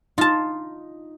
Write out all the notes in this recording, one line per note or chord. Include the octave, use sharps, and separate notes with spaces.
D#4 F4 A5